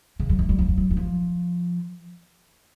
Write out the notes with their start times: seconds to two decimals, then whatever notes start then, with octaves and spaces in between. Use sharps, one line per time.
0.20 C#3
0.29 F#3
0.39 G#3
0.49 G3
0.59 F#3
0.68 F3
0.78 F#3
0.91 F#3
0.97 F3